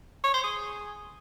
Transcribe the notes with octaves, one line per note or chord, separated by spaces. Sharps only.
C#5
C5
G#4